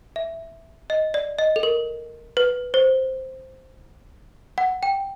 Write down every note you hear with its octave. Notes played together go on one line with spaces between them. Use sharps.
E5
D#5
D5
D#5
A4
A#4
B4
C5
F#5
G5